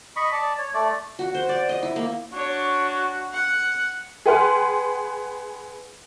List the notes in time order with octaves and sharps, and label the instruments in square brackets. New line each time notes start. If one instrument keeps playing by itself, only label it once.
[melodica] D#5 B5 C#6
D5 A5
C#5
A3 D5
[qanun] F#4
C5
D5
D#5
E4
A#3
[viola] D4 C#5 [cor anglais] F#4
[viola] F#5
[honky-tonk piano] G#4 B4 F#5 G5 C6 F6